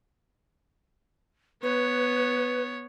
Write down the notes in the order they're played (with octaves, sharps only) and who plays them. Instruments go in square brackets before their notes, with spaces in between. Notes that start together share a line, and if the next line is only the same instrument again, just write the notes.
[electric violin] B3 C#5 [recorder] B4